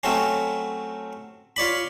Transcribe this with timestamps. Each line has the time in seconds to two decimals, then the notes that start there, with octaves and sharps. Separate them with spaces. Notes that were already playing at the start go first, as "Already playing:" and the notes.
0.03 F#3 A3 C4 C#4
1.56 F4 C#5 D5 B5